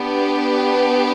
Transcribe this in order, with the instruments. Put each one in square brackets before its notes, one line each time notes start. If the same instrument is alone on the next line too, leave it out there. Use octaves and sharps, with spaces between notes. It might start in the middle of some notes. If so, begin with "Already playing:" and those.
Already playing: [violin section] B3 D4 G4